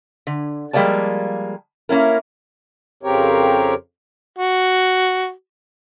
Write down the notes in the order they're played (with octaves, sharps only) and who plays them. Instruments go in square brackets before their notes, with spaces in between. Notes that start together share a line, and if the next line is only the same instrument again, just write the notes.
[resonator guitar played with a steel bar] D3
F3 G3 G#3 A#3 D5 A5
A#3 C#4 E4 A#4
[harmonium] F2 C#3 C4 G4 A#4 C#5
[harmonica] F#4